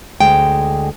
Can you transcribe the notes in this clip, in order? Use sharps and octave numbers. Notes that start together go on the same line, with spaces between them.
D2 G#3 G5